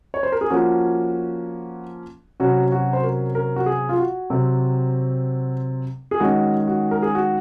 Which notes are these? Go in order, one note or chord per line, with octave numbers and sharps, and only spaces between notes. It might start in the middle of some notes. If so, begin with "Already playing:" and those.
C#5
C5
A#4
G#4
F3 A#3 C#4 F#4
C3 F#3 C#4 F#4
F#4
C5
A#4
A#4
F#4
G#4
F4
F#4
C3 F#3 C4
G#4
D#3 G#3 C#4 F#4
F#4
A#4
G#4
F#4